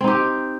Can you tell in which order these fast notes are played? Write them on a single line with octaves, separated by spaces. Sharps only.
C4 D#4 G4